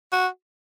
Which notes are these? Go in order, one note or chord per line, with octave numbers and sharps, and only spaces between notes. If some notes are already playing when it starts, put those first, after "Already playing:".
F#4